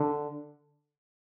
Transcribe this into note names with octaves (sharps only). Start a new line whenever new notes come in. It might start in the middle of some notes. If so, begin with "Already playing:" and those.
Already playing: D3